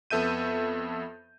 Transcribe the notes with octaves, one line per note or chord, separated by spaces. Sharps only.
F2 B3 A4 E5 G6 D#7